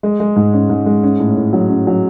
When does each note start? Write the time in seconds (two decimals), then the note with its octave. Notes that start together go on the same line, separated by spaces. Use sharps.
0.03 G#3
0.20 G#3
0.36 G#2
0.53 C#4
0.70 G#2
0.86 G#3
1.03 C#4
1.19 A2
1.37 A2
1.53 F#3
1.69 C#4
1.87 F#3